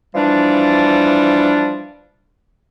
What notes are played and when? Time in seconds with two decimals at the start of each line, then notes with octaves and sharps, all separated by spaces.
0.15 E3 F3 G3 D4